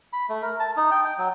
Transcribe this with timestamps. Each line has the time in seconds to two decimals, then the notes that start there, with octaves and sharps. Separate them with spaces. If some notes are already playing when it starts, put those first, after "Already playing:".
0.13 B5
0.29 A3
0.43 A#4
0.60 A5
0.77 D#4
0.91 G5
1.05 G5
1.18 F#3